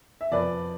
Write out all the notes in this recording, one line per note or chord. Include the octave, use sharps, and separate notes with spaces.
E5
F2 B4 D5